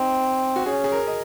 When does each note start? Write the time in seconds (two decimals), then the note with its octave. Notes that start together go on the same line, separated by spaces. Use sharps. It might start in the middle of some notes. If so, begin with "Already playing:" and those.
Already playing: C4 D#4
0.56 F#4
0.66 C#4 G#4
0.84 G#4
0.92 A#4
1.07 D#5